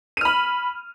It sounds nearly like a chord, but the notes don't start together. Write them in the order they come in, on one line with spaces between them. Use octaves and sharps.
D#7 F6 B5